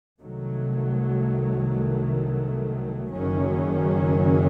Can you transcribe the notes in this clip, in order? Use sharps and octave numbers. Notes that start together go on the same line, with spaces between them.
C2 C3 D#3 F#3 A3
F#1 F#2 D#3 F#3 C#4